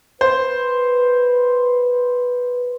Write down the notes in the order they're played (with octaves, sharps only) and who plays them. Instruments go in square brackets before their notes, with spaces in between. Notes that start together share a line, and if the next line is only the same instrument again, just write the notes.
[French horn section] B4 [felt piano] C5